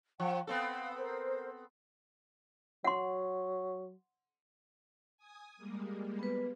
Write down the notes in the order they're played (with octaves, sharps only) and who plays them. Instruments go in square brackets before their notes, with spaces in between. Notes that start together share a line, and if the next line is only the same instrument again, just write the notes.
[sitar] F3 [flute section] F#5 G5
[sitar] B3 C4 A4 [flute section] F5
[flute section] A#4 C5
[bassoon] F#3 [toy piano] F#5 C6
[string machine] G#5 D#6
G3 G#3 A#3
[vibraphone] B3 B4